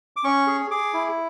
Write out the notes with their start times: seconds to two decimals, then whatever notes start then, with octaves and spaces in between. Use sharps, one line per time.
0.16 D6
0.24 C#4 C#6
0.47 G#4
0.71 G#4 D6
0.94 E4